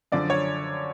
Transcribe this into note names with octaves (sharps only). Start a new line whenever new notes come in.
F#2 D3 F3 D5
C#5